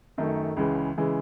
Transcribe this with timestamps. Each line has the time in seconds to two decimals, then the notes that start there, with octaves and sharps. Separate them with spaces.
0.18 F#2 D#3 A3
0.56 C#2 C#3 E3 G#3
0.97 C#3 E3 G#3